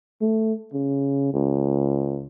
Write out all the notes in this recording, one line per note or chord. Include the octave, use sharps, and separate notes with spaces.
A3
C#3
C#2